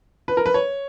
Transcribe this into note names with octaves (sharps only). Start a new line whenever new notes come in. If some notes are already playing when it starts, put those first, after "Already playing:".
B4
A#4
B4
C#5